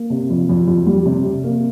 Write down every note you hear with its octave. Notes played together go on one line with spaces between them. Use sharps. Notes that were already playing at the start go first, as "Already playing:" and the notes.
Already playing: A#3
C3
F2
F2
F2
G3
C3
C3
A#3